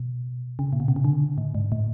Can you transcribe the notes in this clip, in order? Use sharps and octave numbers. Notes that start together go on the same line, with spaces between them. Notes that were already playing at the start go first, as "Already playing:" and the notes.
Already playing: B2
C#3
A#2
B2
C3
C#3
D3
A2
G#2
A2